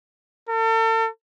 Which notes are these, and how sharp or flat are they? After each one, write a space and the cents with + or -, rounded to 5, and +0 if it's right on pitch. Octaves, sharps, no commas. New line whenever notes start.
A4 +40